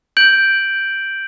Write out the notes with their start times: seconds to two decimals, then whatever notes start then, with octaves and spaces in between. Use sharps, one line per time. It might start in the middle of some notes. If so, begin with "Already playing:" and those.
0.17 G6 D7 F#7